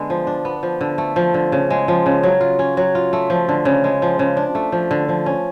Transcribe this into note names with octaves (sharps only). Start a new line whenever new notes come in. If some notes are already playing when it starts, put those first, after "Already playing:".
Already playing: D3 G#3 B3
F3
D4
B3
F3
D3
A3
F3
D3
C#3
G#3
F3
C#3
F#3
F4
C#4
F#3
F4
A3
F3
D3
C#3
G#3
F3
C#3
D4
A3
F3
D3
F3
C#4